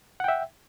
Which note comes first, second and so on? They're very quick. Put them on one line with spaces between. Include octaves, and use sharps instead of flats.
F#5 G5 E5